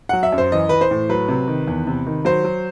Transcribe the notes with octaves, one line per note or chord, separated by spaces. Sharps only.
F#3 F#5
E5
F#2
C5
E3 D#5
E3 B4
C5
A2
F#3 B4
C3
D#3
E2
C3
D#3
F#3 C5
F#3